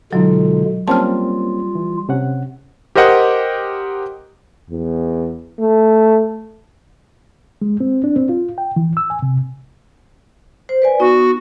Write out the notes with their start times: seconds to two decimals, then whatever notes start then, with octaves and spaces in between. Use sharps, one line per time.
0.13 B2 D3 F#3 G#3 D#4 F4 A4
0.88 G3 A#3 C4 C#4 F4 A5 F6
1.75 E3
2.09 C3 C#4 F#5
2.95 G4 A#4 C5 D#5 F#5
4.70 E2
5.59 A3
7.62 G#3
7.80 C4
8.04 D4
8.16 C4
8.29 F4
8.58 G5
8.76 E3
8.97 E6
9.10 G#5
9.22 C3
10.69 C5
10.82 B4 D5 G#5
11.00 B3 D#4 F#4